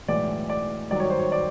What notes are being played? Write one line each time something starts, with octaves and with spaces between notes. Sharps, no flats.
B1 A2 E3 G#3 D5
D5
G#1 G2 D#3 F#3 D5
C#5
C5
C#5
D5